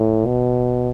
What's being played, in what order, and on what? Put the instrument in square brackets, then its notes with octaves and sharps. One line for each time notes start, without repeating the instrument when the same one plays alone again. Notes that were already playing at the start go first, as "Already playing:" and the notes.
Already playing: [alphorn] A2
B2